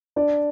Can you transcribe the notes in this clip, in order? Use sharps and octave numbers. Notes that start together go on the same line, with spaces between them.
D4 D5